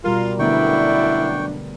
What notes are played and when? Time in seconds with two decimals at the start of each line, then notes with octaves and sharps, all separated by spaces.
0.04 B2 G3 F4 A#4
0.39 F#2 D3 A3 B3 D4 E4 G5 C#6